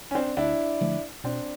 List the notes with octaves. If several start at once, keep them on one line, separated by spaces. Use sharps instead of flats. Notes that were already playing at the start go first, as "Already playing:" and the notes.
C#4
C4 D4
D2 D4 E4
D3 F3 A3
B2 C4 D4